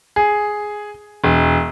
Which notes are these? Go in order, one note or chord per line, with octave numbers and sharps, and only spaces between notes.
G#4
E1